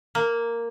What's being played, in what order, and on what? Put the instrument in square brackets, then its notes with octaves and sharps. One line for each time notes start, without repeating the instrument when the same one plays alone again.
[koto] A#3